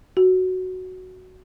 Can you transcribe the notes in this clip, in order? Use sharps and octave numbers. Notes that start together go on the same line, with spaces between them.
F#4